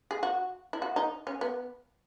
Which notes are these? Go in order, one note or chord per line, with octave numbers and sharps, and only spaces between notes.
G#4
F#4
E4
F#4
D#4
C#4
B3